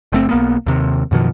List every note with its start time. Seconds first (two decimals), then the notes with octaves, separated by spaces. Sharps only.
0.12 F#1 A3 C4
0.29 B1 A#3 B3
0.67 D#2 C3
1.11 F#2 B2 D#3 F3